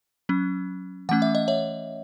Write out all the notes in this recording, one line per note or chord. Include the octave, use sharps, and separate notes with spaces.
F#3 C#4
E3 A3 C#4 F#5
E5
D#5
C#5 E5